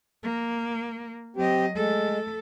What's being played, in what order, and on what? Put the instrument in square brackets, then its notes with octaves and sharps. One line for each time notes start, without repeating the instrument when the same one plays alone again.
[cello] A#3
[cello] F#3 D#5 [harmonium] C4 G4
[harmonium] G#3 [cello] A3 A4